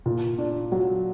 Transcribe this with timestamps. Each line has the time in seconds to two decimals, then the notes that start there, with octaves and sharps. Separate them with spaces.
0.06 A#2
0.38 D4
0.72 F#3